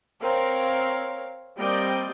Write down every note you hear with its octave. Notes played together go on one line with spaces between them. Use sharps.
C4 A#4 C#5 F5
G3 A#3 C4 D5 D#5 G5